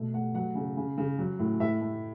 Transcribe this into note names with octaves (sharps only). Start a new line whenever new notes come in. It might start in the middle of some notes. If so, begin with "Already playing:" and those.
Already playing: B2 A3
A3 F#5
F#3 F#5
C#3
C#3
C#3
F#3
A2
A2 E5
A3